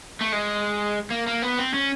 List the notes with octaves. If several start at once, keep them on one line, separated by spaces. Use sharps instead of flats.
A3
G#3
A#3
A#3
B3
C4
C#4